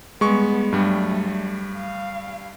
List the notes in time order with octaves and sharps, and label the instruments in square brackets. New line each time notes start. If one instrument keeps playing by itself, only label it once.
[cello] G3 B3 [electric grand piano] G#3 C#6
[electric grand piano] G2 G3 [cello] F#3 A3
[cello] F5